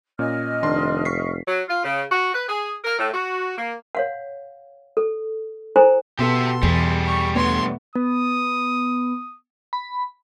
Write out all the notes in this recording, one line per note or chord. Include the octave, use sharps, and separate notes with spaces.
A#2 C#4 D#5 F6
F1 D#3 D4 C6
C#6 B6 C7
F#3
F4
C#3
F#4
B4
G#4
A#4
A2
F#4
A#3
C#5 F5 F#5
A4
E4 A4 C5 G#5 A#5
B2 B3 G4 A4 E5 C6
E2 G3 G#4
C#6
G2 A3 B3 C#5 C6
B3 D#6
B5